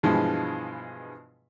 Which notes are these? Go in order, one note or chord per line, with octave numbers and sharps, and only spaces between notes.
G2 B2 E3 F3 G#3